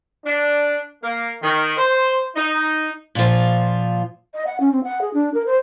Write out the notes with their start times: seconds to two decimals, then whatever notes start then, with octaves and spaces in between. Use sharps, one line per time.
0.25 D4
1.02 A#3
1.42 D#3
1.77 C5
2.36 D#4
3.15 A#2 F3
4.34 D#5
4.47 F#5
4.60 C#4
4.72 C4
4.84 F#5
5.01 G#4
5.14 D4
5.34 A#4
5.46 C5